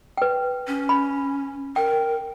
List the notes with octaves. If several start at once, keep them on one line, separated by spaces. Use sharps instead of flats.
B4 G5
C#4
B5
A#4 G5